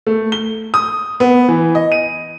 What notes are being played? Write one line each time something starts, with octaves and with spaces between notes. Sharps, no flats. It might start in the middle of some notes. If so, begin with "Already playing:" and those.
A3
G7
D#6
B3
E3
D#5
D#7